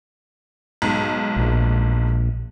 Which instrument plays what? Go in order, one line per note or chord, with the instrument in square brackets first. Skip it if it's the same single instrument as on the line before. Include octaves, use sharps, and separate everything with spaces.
[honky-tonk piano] B1 G#2
[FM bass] A#1